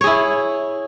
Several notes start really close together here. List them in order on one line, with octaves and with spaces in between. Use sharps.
C#5 G#4 E4